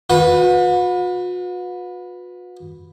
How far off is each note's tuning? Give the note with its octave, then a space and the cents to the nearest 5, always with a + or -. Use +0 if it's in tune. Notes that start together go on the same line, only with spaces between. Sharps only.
F#4 -45 B4 +0